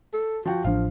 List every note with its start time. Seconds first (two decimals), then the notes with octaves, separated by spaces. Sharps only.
0.13 A4
0.46 F3 F#4 G5
0.65 A1 F3 D4 F5